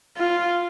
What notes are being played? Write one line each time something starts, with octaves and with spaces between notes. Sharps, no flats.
F4